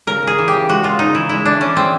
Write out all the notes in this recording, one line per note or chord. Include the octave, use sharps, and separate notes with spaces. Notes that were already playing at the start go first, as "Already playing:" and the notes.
C#3 A#4
C#3 G#4
E3
G4
C#3
G#3 F#4
G#3 F4
C#3 D#4
E3 E4
G#3 E4
E3 D4
E3 C#4
G#3 C4